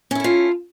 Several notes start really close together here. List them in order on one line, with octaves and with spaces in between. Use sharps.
C#4 E4 A4 F4